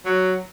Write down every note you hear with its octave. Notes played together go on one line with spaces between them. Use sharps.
F#3